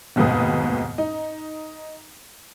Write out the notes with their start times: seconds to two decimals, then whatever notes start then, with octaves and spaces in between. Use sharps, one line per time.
0.16 F1 D#2 G#2 B2 B4 D#6
0.98 D#4